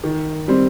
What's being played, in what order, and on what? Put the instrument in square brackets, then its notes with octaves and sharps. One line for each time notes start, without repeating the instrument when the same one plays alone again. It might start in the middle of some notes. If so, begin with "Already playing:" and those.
[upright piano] D#3
G3 C4